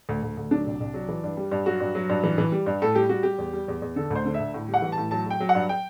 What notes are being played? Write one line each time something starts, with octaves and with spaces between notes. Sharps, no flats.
D2
D2
D2
F#3 D4
C2
C2
F#3
E3
G2
G3
G2
F#3 F#4
G2
F#3
G2
E3
E3
G3
G2
A2 A4
G3 G4
G3 F#4
G3 G4
E2
G3
E2
E2
D3 A4
D2 C5
D3
E5
D2
A2
G3
F#5
E3
A5
A2
F#3 A5
F#3 G5
F#3
F#5
G2
G5